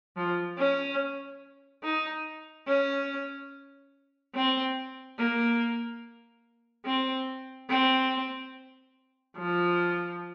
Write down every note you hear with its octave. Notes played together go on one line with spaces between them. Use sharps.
F3
C#4
D#4
C#4
C4
A#3
C4
C4
F3